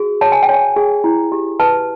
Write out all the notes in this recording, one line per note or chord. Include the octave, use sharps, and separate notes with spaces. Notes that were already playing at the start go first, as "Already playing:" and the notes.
Already playing: F#4 G#4
C#5 A5
G#5
G5
C#5 G#5
G#4
E4
G4
B4 A5